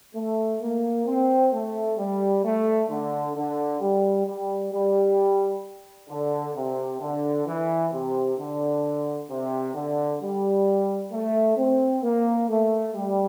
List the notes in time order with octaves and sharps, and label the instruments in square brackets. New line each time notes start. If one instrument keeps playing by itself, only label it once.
[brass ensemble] A3
A#3
C4
A3
G3
A3
D3
D3
G3
G3
G3
D3
C3
D3
E3
C3
D3
C3
D3
G3
A3
C4
A#3
A3
G3